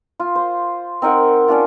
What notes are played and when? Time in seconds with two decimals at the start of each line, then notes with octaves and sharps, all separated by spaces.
0.20 F4
0.35 C5
1.02 C4 D#4 A#4 F#5
1.48 C#4 D4 F4